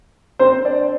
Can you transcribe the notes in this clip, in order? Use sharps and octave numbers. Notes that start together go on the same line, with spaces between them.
C4 C5
C5
D4 D5